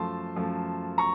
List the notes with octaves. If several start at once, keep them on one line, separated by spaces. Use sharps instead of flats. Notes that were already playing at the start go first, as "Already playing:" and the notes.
Already playing: F#2 F3 A3 A5 C6
F#2 F3 A3
A#5 C#6